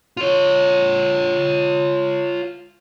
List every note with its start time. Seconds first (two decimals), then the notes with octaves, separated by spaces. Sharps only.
0.17 F4 C#5